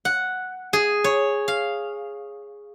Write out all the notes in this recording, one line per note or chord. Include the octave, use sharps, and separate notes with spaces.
F#5
G#4
C#5
F5